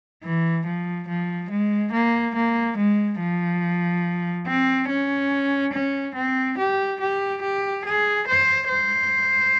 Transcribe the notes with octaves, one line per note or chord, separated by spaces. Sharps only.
E3
F3
F3
G#3
A#3
A#3
G#3
F3
C4
C#4
C#4
C4
G4
G4
G4
G#4
C5
C5